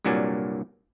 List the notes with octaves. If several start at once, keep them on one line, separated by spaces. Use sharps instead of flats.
C2 G2 A#2 F#3 D5 G#5